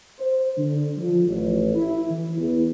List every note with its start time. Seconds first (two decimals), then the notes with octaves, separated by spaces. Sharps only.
0.18 C5
0.57 D3
0.97 F3
1.27 A1
1.74 E4
2.08 E3
2.37 E2